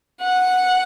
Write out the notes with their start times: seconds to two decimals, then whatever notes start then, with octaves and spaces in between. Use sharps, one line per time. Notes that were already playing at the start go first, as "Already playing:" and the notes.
0.23 F#5